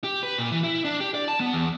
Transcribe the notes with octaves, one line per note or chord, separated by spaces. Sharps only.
G4
B4
A#2
E3
E4
D4
G4
D5
A5
B3
E2